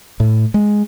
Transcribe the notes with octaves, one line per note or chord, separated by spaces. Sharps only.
A2
G#3